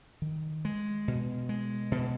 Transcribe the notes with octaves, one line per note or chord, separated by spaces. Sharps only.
D#3
G#3
B2
G#3
B2